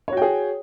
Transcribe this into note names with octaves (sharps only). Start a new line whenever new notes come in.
F#4 G#4 C#5 G5